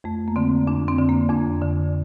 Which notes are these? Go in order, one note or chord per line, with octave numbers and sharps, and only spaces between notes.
F2 A3
A#3
D3 C4
F2 D4
C4
D3
A#3
F2 D4
D3